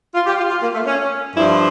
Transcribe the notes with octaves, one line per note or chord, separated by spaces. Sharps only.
F4
G4
F4
F4
A#3
A3
C#4
G2 F3 E4